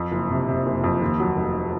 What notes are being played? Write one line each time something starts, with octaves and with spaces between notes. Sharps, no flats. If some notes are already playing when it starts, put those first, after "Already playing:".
Already playing: F2
F#1
C3
C3
F#1
F2
D#2
F#3
F1